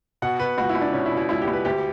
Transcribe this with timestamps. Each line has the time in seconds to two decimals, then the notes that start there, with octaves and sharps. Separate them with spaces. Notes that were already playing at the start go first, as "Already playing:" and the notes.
0.22 B2 F#5
0.40 B2 B4
0.58 C#2 F#4
0.69 E4
0.75 C#2
0.81 D4
0.93 B2 C#4
1.06 E4
1.11 B2
1.17 E4
1.29 C#2 E4
1.42 G4
1.48 C#2
1.53 B4
1.65 D2 G4